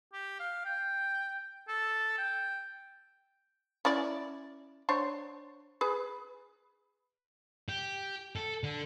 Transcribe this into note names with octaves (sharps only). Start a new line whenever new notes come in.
G4
F5
G5
A4
G5
C#4 E4 D5
D4 C5 C#5
G#4 B4
G4
A4
D3